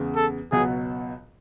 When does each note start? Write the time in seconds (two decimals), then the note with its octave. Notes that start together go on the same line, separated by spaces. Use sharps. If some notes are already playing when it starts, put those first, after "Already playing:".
Already playing: E2 C#3 G#3 B3
0.16 A4
0.52 C#2 B2 F#3 B3 G#4